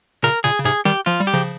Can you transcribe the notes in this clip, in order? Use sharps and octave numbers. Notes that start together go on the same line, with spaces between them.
A#2 C#3 A#4
A#2 C#3 G#4
C#3
G#2 C3 G#4
D#3 G3 G4
F3 F4
G3
G4
C#3 F3